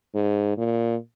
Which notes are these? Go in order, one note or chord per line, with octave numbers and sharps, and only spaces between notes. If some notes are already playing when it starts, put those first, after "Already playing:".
G#2
A#2